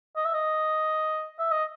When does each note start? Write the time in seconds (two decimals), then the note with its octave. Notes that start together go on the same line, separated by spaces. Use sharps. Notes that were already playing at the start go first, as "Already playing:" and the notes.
0.17 D#5
0.25 E5
0.34 D#5
1.39 E5
1.52 D#5